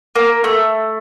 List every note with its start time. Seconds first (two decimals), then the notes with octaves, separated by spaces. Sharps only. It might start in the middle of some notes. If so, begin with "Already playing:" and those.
0.15 A#3
0.44 A3